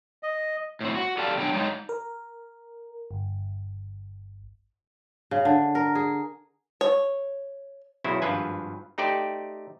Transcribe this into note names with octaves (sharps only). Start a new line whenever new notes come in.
D#5
A2 C4
F#4
G4 A4 D5 F5 G5 A5
B2 F#3 D4 G5
G#2 G#3 A3 D#4 C#5 G5
A#4
G1
C#3
D3
A#4
G#4
C#5
B1 E2 C#3 F#3 E4 C5
G#1 G2 F3 F4 B4 G#5
A3 D#4 G4 C5 D5 G5